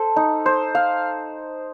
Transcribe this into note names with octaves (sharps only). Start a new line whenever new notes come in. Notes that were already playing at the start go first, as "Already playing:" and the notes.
Already playing: A4 C5
D#4
C5
F5